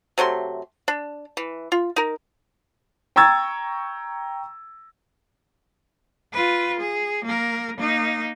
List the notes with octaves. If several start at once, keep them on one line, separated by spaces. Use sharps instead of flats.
C3 F#3 A3 C6
D4
E3
F4
D#4 A#4
G5 A#5 C#6 E6 G#6 A6
F4 B4
G#4
A#3 A#4
A#3 D#4